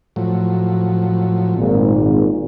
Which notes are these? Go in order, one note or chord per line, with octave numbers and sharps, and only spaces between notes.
A2 F3 F#3
G#1 A#2